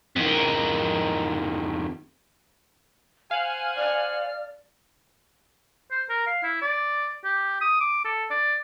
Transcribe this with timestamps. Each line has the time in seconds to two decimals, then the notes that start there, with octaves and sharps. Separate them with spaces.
0.16 F2 D#3
3.31 C5 F5 F#5 G#5 F6
3.76 D5 F6
5.91 C5
6.10 A#4
6.27 F5
6.43 E4
6.62 D5
7.24 G4
7.61 D#6
7.80 D6
8.05 A4
8.30 D5